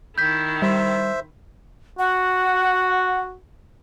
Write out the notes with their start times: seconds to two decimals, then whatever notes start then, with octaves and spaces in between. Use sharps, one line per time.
0.18 D#3 E4 G6 B6
0.62 G3 C5 E5
1.99 F#4 F#5